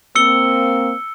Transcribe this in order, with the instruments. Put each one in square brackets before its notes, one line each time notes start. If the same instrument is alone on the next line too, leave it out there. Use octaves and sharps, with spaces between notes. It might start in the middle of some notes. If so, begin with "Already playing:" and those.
[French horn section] A#3 C4 [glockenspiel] E6 C#7 G7